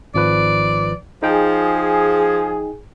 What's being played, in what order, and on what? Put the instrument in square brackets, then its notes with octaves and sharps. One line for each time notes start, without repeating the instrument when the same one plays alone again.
[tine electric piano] G#1 F3 B4 [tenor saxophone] D5
[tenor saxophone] F3 [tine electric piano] D#4 G5 [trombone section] G#4